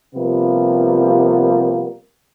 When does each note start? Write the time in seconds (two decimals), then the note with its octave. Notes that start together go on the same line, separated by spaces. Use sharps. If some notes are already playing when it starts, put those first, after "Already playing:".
0.15 C3 F3 G3 A#3 B3